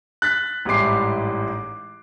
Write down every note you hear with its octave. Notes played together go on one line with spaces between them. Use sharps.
F#6 A6 B6
A1 G#2 G3 E4 D6 C7